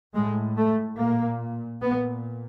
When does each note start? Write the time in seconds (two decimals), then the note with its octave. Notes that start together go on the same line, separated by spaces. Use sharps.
0.14 A2 G#3
0.57 A3
0.98 A#2 A#3
1.81 A#2 B3